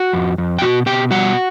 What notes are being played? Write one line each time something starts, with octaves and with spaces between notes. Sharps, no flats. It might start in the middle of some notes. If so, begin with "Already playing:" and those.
Already playing: F#4 F#5
F2
F2
G5
B2 F#4
B2 G4 G5
G3 F#4 F#5